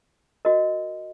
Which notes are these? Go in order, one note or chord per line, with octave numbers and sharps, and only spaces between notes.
F#4 A#4 D#5